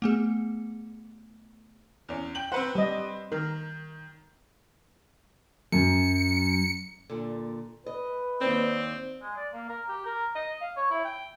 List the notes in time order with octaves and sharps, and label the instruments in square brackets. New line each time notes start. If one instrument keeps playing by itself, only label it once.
[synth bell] A3 B3 G#4
[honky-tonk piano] E2 C#4
G5 F#7
[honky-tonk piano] C4 B4 C5 [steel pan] F#5
[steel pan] G3 D#5
[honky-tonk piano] D#3 [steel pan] A#4
[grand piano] F#2 [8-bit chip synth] C#7
[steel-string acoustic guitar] A#2 D3
[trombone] B4 [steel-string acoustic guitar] D#5
[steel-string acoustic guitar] D#2 D#4 D5 [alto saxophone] C4
[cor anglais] G#3
D5
A#3
A#4
G4
A#4
D#5
F5
C#5
E4
G5